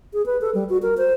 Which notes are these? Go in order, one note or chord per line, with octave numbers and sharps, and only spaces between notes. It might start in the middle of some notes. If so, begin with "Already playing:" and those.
G#4
B4
A4
G3
F#4
A#4
C5